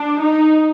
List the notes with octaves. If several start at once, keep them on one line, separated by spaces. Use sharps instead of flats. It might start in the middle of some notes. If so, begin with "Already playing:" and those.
Already playing: D4
D#4